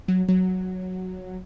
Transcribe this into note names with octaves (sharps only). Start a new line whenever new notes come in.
F#3
F#3